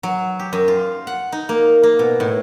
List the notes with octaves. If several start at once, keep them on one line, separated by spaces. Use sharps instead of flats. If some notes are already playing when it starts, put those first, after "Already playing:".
F#3
G4
F#2
F4
F#5
D#4
A#3
A#3
B2
A2